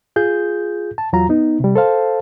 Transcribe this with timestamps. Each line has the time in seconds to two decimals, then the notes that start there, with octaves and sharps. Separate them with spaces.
0.16 F4 G#4 G6
0.98 A5
1.13 E2 F#3 F4 A#5
1.29 B3 D#4
1.60 C3 G3
1.76 A4 C5 F5 A5